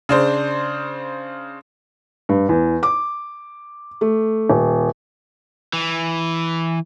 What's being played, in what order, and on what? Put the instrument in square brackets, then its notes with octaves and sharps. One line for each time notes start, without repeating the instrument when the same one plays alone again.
[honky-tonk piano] C#3 D4 C5
[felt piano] G2
E2
D6
A3
D#1
[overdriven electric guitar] E3